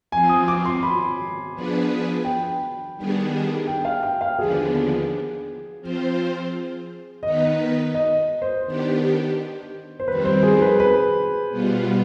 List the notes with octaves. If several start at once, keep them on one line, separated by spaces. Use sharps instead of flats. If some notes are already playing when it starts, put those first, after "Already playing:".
F3 C4 F4 G#5
D#6
D6
C6
B5
F3 B3 D4 G#4 B4
G5
D#3 G3 B3 D4 G#4
G5
F5
G5
F5
D#2 D3 F3 B3 D4 G#4
F3 C4 F4 C5
D#3 B3 D#4 B4 D#5
D#5
C5
D#3 B3 D4 G4
C5
F2 D#3 G3 C4 B4
C5
G#4
B4
B4
B2 G3 B3 F4